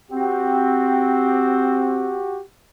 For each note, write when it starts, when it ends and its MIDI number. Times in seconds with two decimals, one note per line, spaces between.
0.11 2.20 60
0.11 2.40 66
0.11 2.40 67